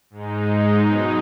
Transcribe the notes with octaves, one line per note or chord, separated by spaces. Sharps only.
G#2 G#3 D#4
B2 F#3 D#4